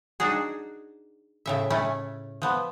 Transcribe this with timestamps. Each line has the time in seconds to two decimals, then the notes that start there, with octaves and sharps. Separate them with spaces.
0.20 D4 D#4 F#4 G#4
1.46 A2 C#3 E5
1.70 A3 C#4 E4
2.42 F3 B3